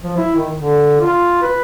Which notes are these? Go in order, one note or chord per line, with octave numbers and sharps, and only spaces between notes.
F3
E4
D#3
D3
F4
B4